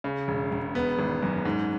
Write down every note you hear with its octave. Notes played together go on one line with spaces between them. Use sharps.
C#3
E1
E1
B3
G#1
F#2
G#2